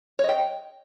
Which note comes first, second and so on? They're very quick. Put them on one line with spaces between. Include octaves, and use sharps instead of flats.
C#5 D#5 G5